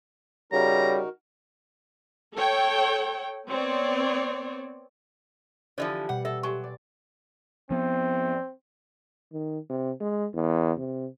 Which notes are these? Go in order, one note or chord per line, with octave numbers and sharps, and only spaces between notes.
C#3 G3 D#4 F#4 A#4 A#5
A4 C#5 G5
B3 C4 C#5 D5
D3 E3 F3 G4 C5 D5 E5
B2 G3 F#5
A4 E5
F#3 G4 G#5 C#6
D5
F3 B3 C4
D#3
C3
G#3
E2
C3